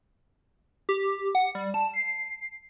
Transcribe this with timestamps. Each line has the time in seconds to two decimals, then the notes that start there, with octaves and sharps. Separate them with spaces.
0.89 G4
1.35 F#5
1.55 G3
1.74 A5
1.94 C7